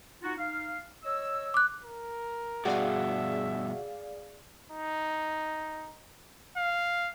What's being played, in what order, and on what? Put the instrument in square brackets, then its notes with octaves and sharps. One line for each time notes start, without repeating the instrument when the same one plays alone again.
[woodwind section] D#4 F4 F#4
D#4 F5
C#5 D#5 E6
[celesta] D6 F#6
[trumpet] A#4
[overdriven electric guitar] G2 B2 [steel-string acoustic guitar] F#4 [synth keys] G#4 D5 F5 [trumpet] E5
[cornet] D#4
F5